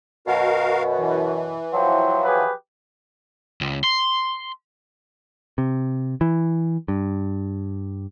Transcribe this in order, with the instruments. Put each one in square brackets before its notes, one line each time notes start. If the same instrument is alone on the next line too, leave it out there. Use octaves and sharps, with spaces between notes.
[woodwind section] F#2 B2 [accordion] F#4 A#4 F5
[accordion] E3
[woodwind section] F3 F#3 [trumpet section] E5 G5 C6
[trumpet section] G4 G#4 B4
[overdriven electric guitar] C#2
C6
[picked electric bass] C3
E3
G2